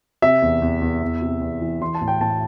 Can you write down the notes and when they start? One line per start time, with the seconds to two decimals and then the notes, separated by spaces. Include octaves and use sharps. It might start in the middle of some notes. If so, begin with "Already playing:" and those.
0.22 C3 E5
0.42 E2
0.62 E2
0.81 E2
1.02 E2
1.22 C3
1.41 E2
1.61 E3
1.81 E3 C6
1.95 A5
2.01 A2
2.08 G5
2.21 A2 A5